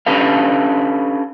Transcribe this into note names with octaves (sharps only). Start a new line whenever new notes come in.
C#4 D4 G4 A4 B4 F5